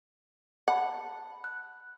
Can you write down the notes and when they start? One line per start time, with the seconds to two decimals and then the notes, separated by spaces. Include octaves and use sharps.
0.68 F#5 A5 B5
1.44 F#6